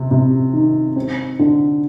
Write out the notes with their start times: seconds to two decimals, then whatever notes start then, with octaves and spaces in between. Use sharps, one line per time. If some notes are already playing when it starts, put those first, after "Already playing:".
Already playing: C3
0.11 C3
0.53 D#3
0.96 C4
1.39 D3